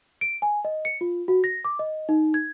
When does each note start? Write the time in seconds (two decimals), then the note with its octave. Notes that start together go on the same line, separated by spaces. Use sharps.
0.21 D7
0.42 G#5
0.65 D#5
0.85 C#7
1.01 F4
1.28 F#4
1.44 A#6
1.65 D6
1.79 D#5
2.09 D#4
2.34 G#6